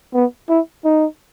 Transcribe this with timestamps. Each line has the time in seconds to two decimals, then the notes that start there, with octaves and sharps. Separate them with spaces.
0.14 B3
0.49 E4
0.85 D#4